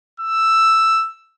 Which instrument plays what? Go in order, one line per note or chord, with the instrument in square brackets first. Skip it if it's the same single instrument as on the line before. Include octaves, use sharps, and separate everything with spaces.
[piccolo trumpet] E6